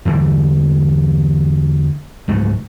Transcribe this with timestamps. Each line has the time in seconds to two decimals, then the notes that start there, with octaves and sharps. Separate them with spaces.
0.05 E2 D3 E3 G3
2.28 C#2 G#2 F#3 A3